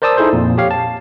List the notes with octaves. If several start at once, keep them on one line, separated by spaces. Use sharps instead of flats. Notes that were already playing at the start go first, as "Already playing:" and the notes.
A#4 C5 D5 A5 D#6 E6
D#4 E4 G#4 A4 C5
F2 A#2
G4 C#5 F5
A5